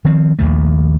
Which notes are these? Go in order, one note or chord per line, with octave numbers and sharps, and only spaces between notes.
D#3 F3 C4
A#1 D#2 D#3 A3